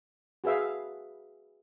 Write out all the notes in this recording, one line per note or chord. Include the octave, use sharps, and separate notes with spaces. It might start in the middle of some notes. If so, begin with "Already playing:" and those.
F#4 G#4 B4 E5 F5